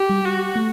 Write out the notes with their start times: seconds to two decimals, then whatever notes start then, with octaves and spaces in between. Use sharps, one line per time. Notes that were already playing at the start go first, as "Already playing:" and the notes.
Already playing: G4
0.09 G3
0.25 F#4
0.56 A3